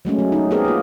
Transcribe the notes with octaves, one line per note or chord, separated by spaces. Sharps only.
F#3 G#3 A3 C#4
F#3
D#4
B3 C4 G4 G#4 A#4
A#3 F4